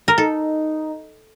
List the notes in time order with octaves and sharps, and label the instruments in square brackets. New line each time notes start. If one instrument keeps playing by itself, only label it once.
[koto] A#4
[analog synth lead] D#4 [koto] A4